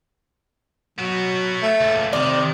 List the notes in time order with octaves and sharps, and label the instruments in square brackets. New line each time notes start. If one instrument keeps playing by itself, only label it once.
[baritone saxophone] F#3 [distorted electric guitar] B3 F#4
[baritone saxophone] A3
[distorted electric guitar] C#2 A#2
[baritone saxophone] C3 [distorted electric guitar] D#3 [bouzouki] D5